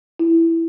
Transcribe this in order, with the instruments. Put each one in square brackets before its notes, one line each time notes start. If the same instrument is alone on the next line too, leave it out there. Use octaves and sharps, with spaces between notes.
[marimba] E4